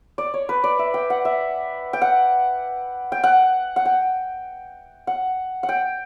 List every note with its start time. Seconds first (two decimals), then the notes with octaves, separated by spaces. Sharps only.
0.18 D5
0.34 C#5
0.49 B4
0.64 D5
0.79 E5
0.94 G5
1.10 F#5
1.25 E5
1.93 G5
2.01 F#5
3.12 G5
3.24 F#5
3.76 F#5
3.85 G5
5.07 F#5
5.63 F#5
5.69 G5